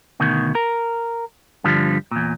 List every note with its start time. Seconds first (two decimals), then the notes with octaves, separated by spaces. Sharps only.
0.20 D2 B2 D#3
0.55 A#4
1.64 G2 D3 F3 G3
2.11 E2 A#2